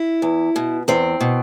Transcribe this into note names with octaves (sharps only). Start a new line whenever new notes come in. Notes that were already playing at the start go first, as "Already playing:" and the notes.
Already playing: E4
E2
B2
E2 C4
B2